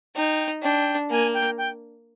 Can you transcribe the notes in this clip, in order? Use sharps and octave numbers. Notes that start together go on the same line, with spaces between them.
D#4 G5
D4 G5
A#3 G#5
G5
G5